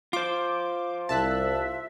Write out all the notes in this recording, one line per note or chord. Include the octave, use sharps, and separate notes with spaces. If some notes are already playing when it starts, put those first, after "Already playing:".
F4 C5 D6
C2 E5 A5 E6 F#6